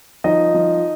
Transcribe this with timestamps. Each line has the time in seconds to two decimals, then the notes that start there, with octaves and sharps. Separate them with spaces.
0.24 F3 D#4 D#5
0.54 F3